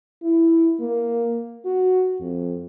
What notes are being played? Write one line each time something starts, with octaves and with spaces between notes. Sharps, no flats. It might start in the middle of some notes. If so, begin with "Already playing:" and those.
E4
A#3
F#4
F2